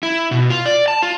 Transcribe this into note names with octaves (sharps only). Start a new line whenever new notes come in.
E4
B2
F4
D5
A5
F4